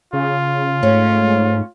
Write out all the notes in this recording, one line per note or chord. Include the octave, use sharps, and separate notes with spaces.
C#3 F4
G#2 A3 C#4